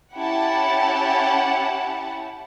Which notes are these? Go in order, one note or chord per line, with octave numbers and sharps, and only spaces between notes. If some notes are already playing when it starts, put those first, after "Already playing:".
C#4 E4 G4 F#5 A5